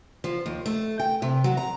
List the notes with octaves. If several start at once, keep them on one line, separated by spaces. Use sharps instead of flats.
F3
D#2
A3
G5
C3
F#3
A#5